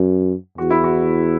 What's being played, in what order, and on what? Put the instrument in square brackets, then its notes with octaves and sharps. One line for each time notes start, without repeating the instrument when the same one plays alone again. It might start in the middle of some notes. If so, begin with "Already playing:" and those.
Already playing: [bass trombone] F#2
[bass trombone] E2 [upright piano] F#4
[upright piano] E4
F#4